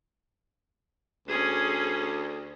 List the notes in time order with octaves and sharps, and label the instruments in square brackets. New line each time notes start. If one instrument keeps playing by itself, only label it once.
[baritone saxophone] D2 [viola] C#4 G#4